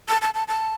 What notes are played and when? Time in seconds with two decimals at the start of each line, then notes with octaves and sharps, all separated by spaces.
0.09 A5
0.22 A5
0.34 A5
0.48 A5